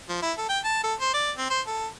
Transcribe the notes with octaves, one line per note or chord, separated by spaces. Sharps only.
F3
E4
A4
G5
A5
A4
C5
D5
C4
C5
A4